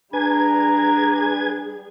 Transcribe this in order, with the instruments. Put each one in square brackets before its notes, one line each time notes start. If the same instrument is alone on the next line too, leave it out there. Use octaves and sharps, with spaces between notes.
[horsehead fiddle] G3 G#4 [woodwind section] D4 [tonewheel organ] B4 G#5 G#6 [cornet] A#5